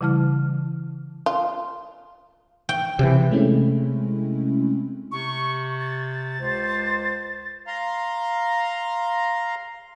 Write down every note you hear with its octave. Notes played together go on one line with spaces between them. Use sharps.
C#3 E3 G3 E4 A5 F6
F4
G5
C3 E3
C3 G#3 A3 C4 C#4 E4
C3 C#6
A6
C#2 C5
F5 A#5 C6